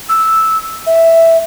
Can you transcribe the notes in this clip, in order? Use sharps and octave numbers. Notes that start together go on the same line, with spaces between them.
E6
E5